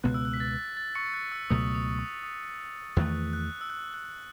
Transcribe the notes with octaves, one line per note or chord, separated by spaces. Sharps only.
C#2 B2 G#3 B3 F#6
E6
F#6
B6
A6
A6
C#6 C#7
F#6
E6
C#2 B2 F#3 A3 D#6
D#6
C#6
D#6
E2 D#3 A3 F#6
F#6
E6
F#6
F#6